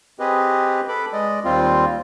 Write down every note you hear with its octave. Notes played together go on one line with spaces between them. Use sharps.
C4 G4 G#4 B4 D#5
A4 B4 B5 D6
G#3 D5 D#5
D#2 G3 C4 F4